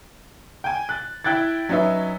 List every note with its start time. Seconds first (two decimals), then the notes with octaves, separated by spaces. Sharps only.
0.64 G5 G#5
0.89 F#6 A6
1.24 E4 G5 F#6 G#6 A6
1.69 F#3 C#4 D#4 B4 E5